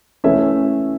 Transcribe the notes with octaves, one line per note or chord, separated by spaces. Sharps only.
E3 A3 C#4 E5